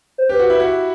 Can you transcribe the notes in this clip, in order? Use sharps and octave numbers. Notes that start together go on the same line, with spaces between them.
C5
G4 B4
F#4
E4
F#4